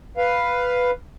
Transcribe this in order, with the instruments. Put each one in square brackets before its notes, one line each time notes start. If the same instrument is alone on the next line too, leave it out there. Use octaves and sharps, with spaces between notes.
[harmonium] B4 F5